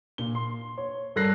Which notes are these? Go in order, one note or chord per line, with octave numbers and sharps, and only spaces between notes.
A#2 G7
C6
C#5
G2 A4 A#4 F#6 A#6 C7